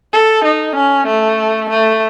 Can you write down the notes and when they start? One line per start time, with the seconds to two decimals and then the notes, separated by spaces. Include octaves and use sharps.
0.14 A4
0.44 D#4
0.76 C#4
1.07 A3
1.70 A3